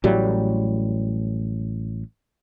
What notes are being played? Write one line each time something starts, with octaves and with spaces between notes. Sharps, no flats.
A1 A2 F#3 G3